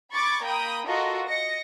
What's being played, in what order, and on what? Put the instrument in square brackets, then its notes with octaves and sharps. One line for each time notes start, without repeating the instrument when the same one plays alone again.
[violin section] B5 C#6 D6 G#6 A6
A#3 A#4 G5 B5 D#6
F4 F#4 A4 A#4 D#5
D#5 A#6 C#7